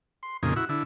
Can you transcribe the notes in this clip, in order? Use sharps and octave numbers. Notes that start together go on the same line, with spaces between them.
C6
F2 A#2 C#3 D#4 G#4
E4 F#4
D3 E4